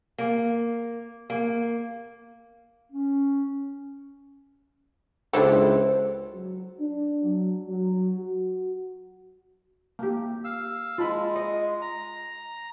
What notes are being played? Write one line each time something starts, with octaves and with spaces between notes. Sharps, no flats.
A#3
A#3
C#4
C#2 D4 E4 G4 A4 C5
F#3
D4
F#3
F#3
F#4
A#3 G4
F5 E6
G#3 F4 A5 B5
D#5
A#5